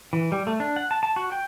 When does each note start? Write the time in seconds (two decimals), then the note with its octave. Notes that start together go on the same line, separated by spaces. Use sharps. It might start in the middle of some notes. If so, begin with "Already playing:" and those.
0.13 E3
0.32 G3
0.47 A3
0.60 D4
0.76 F#5
0.91 A5
1.03 A5
1.16 F#4
1.32 G5